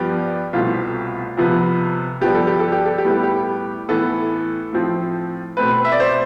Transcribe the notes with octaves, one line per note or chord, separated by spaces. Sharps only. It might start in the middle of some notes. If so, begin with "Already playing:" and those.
Already playing: G2 F3 B3 G4
C2 B2 A3 C4 F4
F2 C3 F3 B3
G2 F3 B3 G4
A4
G4
A4
G4
A4
G4
A2 G3 B3
A4
G4
A2 E3 B3 A4
A2 F3 C4
B2 A3 C4 B4
E5
D5
C5